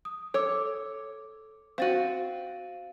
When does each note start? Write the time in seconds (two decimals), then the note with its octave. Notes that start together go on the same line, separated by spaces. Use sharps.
0.05 D#6
0.34 A4 C#5 D6 E6
1.78 C4 F#4 F5 A6 D#7